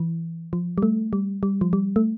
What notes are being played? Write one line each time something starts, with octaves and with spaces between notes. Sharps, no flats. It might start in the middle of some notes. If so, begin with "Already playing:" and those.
Already playing: E3
F3
G3
A3
G3
G3
F3
G3
A3